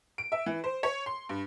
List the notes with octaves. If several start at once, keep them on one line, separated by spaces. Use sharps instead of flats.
D7
E5
E3
C5
C#5
C6
G2